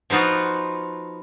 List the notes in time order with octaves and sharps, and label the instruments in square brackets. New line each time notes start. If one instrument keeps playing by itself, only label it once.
[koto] F3 B3 D#4 F4 F#4